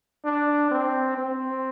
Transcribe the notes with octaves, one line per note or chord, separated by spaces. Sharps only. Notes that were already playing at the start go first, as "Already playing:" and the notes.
D4
C4
C4